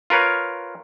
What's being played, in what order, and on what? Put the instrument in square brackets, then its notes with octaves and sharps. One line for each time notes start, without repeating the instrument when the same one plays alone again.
[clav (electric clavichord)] F4 A#4 B4 C#5